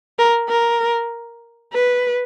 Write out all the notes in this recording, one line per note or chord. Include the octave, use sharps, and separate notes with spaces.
A#4
A#4
B4